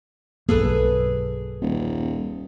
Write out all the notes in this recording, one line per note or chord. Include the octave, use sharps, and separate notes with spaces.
B1 G2 A#3 G#4 A4 B4
D#1